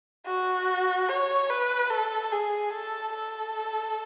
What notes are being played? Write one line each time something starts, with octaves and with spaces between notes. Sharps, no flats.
F#4
C#5
B4
A4
G#4
A4
A4